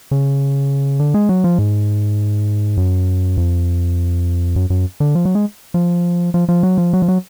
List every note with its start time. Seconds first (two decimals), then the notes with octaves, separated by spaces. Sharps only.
0.11 C#3
0.99 D3
1.14 G#3
1.29 F#3
1.44 F3
1.59 G#2
2.77 F#2
3.37 F2
4.56 F#2
4.70 F#2
5.00 D3
5.15 F3
5.25 F#3
5.35 G#3
5.74 F3
6.34 F3
6.49 F3
6.63 F#3
6.78 F3
6.93 F#3
7.02 F3
7.08 F#3